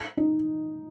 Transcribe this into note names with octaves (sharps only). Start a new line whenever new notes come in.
D#4